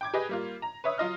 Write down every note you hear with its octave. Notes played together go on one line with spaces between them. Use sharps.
G5 D6 G#6
G4 G#4 B4 D#5
G3 A#3 F4
A#5
B4 C#5 E5 D#6
F#3 F4 D#5 F6